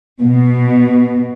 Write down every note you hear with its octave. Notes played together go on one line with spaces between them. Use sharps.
B2